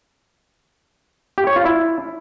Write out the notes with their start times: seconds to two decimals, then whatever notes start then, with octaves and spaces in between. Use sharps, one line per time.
1.38 G4
1.47 C#5
1.56 F4
1.65 E4